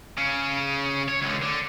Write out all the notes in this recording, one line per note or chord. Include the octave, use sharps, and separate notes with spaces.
C#3 C#4
C#5
C#2 D3
D3